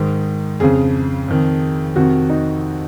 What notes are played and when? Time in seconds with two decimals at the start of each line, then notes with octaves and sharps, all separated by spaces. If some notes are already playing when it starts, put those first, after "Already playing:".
Already playing: G#2 D#3
0.60 F2 C#3 G#4
1.28 F2 D#3
1.96 F2 C3 D#3 F#4
2.30 D#4